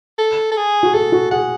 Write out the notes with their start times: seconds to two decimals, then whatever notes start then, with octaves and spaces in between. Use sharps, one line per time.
0.19 A4
0.52 A4
0.57 G#4
0.83 F#4
0.94 G#4 A4
1.12 F#4
1.31 G#4 F#5